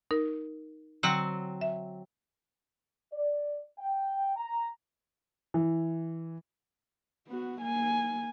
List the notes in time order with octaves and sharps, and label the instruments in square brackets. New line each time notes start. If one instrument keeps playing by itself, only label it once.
[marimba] D#4 A#4
[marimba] D3 [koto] F#3 C4 F#5
[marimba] E5
[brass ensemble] D5
G5
A#5
[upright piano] E3
[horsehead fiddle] B3 F#4
A#3 G#5